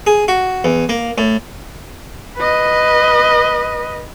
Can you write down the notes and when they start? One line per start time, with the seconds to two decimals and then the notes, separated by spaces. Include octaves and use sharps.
0.07 G#4
0.28 F#4
0.64 E2
0.89 A#3
1.18 A2
2.37 B4 D#5